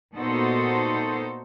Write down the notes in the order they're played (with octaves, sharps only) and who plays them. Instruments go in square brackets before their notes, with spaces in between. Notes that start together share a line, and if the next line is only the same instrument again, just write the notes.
[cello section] A#2 B3 D#4 F#4 A4 C5